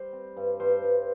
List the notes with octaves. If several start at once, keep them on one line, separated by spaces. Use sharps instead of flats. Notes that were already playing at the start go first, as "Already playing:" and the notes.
Already playing: G3 C5
C4
G2
G2 C5
G2